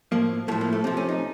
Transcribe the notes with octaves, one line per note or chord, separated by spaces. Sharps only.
A2 F3 A#3
A2 F3 A3
A#3
A3
C3 F3 C4
C#4
D#4